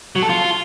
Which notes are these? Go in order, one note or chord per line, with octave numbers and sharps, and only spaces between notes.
F#3
A4
F4